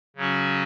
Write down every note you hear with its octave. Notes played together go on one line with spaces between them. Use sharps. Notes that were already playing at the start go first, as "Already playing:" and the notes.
C#3 F#3 C#4 F#4